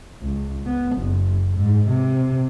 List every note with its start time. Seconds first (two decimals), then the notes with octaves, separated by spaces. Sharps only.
0.22 C#2
0.66 B3
0.97 F#1
1.57 G#2
1.89 C3